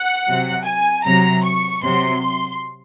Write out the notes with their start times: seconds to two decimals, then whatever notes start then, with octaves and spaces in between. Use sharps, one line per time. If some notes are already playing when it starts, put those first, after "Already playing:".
Already playing: F#5
0.26 C3 F#3
0.64 G#5
1.04 C3 F#3 A#5
1.45 C#6
1.83 C3 F#3 C6